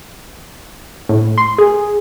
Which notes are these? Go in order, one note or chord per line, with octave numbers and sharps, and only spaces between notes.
A2
C6
G#4